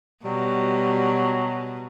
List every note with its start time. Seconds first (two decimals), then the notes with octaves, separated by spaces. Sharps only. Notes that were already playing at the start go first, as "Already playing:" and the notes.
0.25 B2 F#3 G3